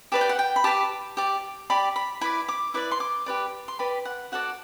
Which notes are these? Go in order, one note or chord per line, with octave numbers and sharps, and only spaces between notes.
G4 B4 D5 A5
G5
F#5
G5
B5
G4 B4 D5 A5
G4 D5
G4 D5 B5
B5
E4 B4 D5 B5
D6
E4 B4 D5 D6
C6
D6
G4 B4 D5
C6
G4 B4 D5 B5
F#5
F#4 A4 D5 F#5